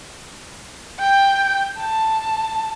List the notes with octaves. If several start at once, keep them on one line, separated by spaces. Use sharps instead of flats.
G5
A5